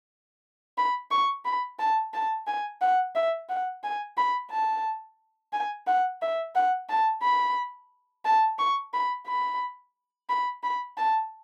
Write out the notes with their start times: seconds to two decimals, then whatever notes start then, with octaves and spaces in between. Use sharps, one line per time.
0.78 B5
1.11 C#6
1.45 B5
1.79 A5
2.14 A5
2.47 G#5
2.81 F#5
3.15 E5
3.49 F#5
3.84 G#5
4.17 B5
4.51 A5
5.53 G#5
5.87 F#5
6.22 E5
6.55 F#5
6.89 A5
7.23 B5
8.25 A5
8.59 C#6
8.93 B5
9.27 B5
10.29 B5
10.63 B5
10.97 A5